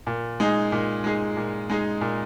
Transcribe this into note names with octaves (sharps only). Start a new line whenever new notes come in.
A#2
G#3 D#4 G#4
A#2
G#3 D#4 G#4
A#2
G#3 D#4 G#4
A#2